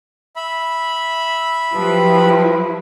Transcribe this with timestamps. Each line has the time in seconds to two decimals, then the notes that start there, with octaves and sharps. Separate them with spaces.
0.36 E5 B5
1.74 F3 F#3 E4 G4 B4